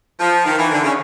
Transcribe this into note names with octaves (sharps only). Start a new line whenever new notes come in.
F3
D#3
E3
D3
C#3